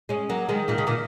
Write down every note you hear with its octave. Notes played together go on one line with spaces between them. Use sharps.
G#3 C#4
F#3 A#3
D#3 G#3
A#2 D#3
C#3
A#2 D#3